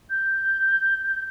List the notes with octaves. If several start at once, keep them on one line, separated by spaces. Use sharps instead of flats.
G6